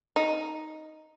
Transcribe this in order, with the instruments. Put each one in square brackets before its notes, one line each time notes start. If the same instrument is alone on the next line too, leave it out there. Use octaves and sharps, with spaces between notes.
[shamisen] D#4